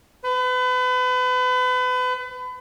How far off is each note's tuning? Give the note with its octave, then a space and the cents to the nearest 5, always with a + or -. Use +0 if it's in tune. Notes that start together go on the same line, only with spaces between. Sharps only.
B4 +35